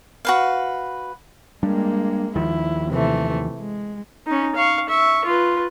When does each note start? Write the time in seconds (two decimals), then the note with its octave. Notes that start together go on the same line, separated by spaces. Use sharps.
0.25 F#4 B4 F5
1.63 G3 G#3 A#3 D4
2.35 D#2 D#3 F3 E4
2.90 C3 E3 A3
3.60 G#3
4.27 C#4 D#4
4.55 F5 C#6
4.89 E5 C#6
5.25 F4 B4